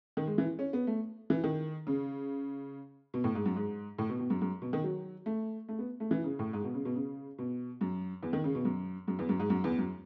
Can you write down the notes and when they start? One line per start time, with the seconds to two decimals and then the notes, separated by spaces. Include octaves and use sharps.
0.17 D#3
0.27 G#3
0.38 E3
0.59 C#4
0.73 B3
0.87 A3
1.30 E3
1.44 D#3
1.87 C#3
3.14 B2
3.24 A2
3.35 G#2
3.45 F#2
3.56 G#2
3.98 A2
4.09 B2
4.19 B2
4.30 F#2
4.41 F#2
4.62 B2
4.73 D#3
4.84 F#3
5.26 A3
5.68 A3
5.79 B3
6.00 A3
6.11 E3
6.24 C#3
6.39 A2
6.53 G#2
6.64 B2
6.74 C#3
6.85 B2
6.96 C#3
7.38 B2
7.81 F#2
8.23 E2
8.33 D#3
8.44 C#3
8.55 B2
8.65 F#2
9.08 F#2
9.19 E2
9.29 F#2
9.40 G#2
9.50 F#2
9.64 E2
9.78 F#2